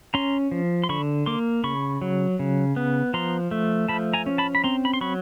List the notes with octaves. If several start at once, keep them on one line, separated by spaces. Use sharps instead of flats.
C#4 A#5 C6
F3
C6
D3 B5 C#6
A#3 C6 D6
C#3 B5 C#6
F#3
C#3
B3
F3 A#5 C6
A3
F3 A5 B5
G#5 A#5
C#4
A5 B5
B5
C4 A#5 C6
B5
C6
F#3 B5 C#6